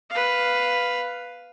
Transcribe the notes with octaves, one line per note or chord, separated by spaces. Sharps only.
B4 F5